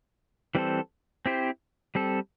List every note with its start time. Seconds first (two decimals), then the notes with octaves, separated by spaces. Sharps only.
0.55 E3 G3 C4 A4 C5
1.26 C4 E4 G4 C5
1.95 G3 C4 A4